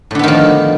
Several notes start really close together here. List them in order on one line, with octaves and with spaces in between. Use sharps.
A2 D3 B3 D#3 F3